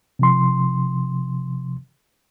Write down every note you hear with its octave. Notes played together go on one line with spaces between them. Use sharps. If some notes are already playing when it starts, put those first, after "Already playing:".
C3 F3 C6